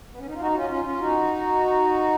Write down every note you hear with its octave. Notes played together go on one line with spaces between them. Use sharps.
B3
C#4
D#4
F4
D#4 F#4
F#4
C#4 F4
C#4 F4
C#4 F4
D#4 F#4